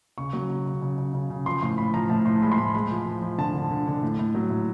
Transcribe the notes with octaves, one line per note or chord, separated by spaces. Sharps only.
C#3 C#6
F#3
C#3
C#3
C#3
C#3
C#3
C#3
F3 C6
A2 C6
A2 B5
F3 A#5
A2 A5
A2 C6
G#3 B5
C6
A2 B5
G#3 B5
F3
F3
F3
D3 A5
D3
D3
D3
A2
A2
F#3
A2